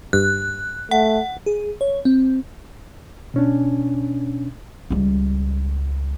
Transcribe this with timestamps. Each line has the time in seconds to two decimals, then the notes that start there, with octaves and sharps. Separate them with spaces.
0.13 G2 F#6
0.91 A3 F#5
1.46 G#4
1.81 C#5
2.05 C4
3.34 B2 C#4 D4
4.90 C#2 G3